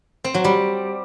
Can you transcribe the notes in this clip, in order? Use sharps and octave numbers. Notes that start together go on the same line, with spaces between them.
C4
F#3
G3